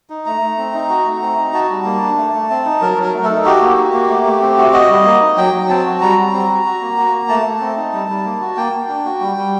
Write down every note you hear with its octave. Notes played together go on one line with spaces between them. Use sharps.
D#4
A3 A#5
A3
C4
D#4
F#4
A3
C4
D#4
F#4 A5
G3
A#3
D4
A3
A3
C4
D#4
F#3 A#4
F#3
A#4
A3
A4
D#4
F#4 G4
A#3
F#4
A#3
A3
A3
C4
F#4
F#4 D#5
G3
A#3
D#4
F#3 G5
F#3
C4 A5
F#4
G3 A#5
G3
C4
F#4
F#4
A#3
F#4
A#3
A3 A5
A3
C4
D#4
G3
G3
A#3
F#4
A#3 G5
A#3
D4
F#4
G3
G3